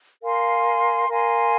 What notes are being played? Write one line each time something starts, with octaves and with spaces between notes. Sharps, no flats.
A#4 F5 G#5 C6
A#4 F5 G#5 C6